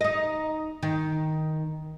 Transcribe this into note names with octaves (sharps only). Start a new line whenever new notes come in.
D#4 D#5
D#3